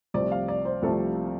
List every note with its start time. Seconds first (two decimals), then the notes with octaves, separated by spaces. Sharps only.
0.14 C2 C3 F3 A3 C4 D5
0.32 F5
0.48 D5
0.65 C5
0.82 C2 C3 F3 A3 C4 A4